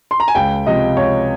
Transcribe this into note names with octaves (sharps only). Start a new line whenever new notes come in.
C6
A#5
G#5
C#2 G5
C3 F3 D#5
C#2 C#5